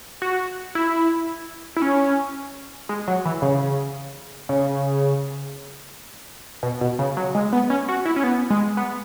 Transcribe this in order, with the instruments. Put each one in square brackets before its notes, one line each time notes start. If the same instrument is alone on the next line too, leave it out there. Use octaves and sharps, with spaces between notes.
[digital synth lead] F#4
E4
E4
C#4
G#3
F#3
E3
C#3
C#3
B2
B2
C#3
F#3
G#3
B3
C#4
F#4
E4
C#4
B3
G#3
B3